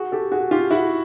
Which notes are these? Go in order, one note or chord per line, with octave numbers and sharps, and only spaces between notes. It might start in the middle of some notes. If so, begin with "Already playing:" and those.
Already playing: F#4 G#4
G4 A4
F#4 G#4
F4 G4
E4 F#4